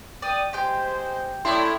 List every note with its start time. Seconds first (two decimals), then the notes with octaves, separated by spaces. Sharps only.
0.22 D5 G5 D#6
0.53 G#3 G4 C5 G5 G#5
1.45 A2 E4 D5 C6